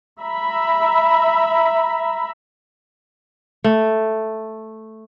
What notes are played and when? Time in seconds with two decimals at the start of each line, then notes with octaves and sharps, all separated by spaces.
0.20 E5 A#5 B5
3.64 A3